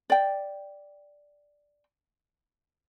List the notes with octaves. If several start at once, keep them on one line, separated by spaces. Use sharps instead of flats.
D5 G5